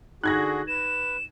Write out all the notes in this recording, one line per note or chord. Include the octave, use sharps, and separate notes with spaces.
D3 D#4 F#4 G#4 F#6 G#6 A#6
B4 E7